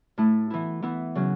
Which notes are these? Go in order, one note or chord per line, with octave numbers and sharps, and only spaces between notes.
A2 A3 E4
E3 B3 E4
E3 B3 E4
C#3 F#3 C#4